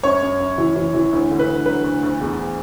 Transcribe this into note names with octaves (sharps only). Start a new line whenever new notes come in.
F#2 C#5
F#2
F#2
E3
E3
E3
D2
D3
B4
D2
F#3 B4
D2
D2
E2